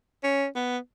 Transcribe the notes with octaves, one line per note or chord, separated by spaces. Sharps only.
C#4
B3